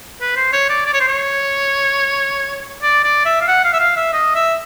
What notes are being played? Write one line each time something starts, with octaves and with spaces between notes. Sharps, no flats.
B4
C5
C#5
D5
D5
C#5
C5
C#5
D5
D5
E5
F5
F#5
F5
E5
F5
E5
D#5
E5